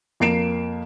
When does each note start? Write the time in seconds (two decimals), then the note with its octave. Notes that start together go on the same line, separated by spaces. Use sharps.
0.20 F2 A#3 C7 D7 E7